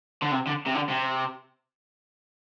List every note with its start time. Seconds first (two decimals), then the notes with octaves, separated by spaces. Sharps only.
0.23 D3
0.33 C3
0.47 D3
0.66 C3
0.74 D3
0.89 C3